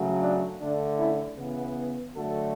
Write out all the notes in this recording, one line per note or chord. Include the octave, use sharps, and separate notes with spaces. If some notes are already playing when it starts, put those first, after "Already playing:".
Already playing: C#3 F#3 A3
D4
D3 A3 D4
C#4 E4
C#3 E3 B3
D3 F#3 A3 F#4 A4